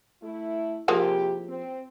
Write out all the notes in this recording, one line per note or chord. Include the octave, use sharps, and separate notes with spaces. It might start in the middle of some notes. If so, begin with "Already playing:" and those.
A3 E4
C3 F3 G#3 A#3 E4 G4
C4